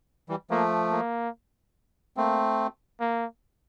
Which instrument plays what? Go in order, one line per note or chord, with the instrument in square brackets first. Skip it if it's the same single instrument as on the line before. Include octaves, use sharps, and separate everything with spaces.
[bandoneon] E3 G3
[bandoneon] F3 A3 [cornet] A#3
[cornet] A#3
[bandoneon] A3 C4 [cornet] A#3
[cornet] A#3